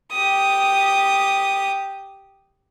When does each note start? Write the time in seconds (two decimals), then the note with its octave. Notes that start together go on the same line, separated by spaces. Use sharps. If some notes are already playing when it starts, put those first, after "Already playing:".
0.12 G4 D#6